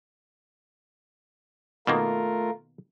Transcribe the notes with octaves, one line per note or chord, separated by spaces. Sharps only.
B2 D#3 A3 A#3 F4 A#4